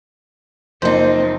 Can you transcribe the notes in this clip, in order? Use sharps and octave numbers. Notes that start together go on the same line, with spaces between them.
F#1 F3 A#3 C4 D#4 C5